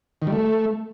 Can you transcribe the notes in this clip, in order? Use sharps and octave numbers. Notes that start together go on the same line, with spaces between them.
D#3
G3
A3